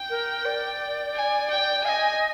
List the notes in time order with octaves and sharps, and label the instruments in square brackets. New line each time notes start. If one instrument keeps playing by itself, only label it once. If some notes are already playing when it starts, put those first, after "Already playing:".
Already playing: [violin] G5
[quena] A#4
D5
[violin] G#5
G5
[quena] F5 [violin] G#5
[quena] D#5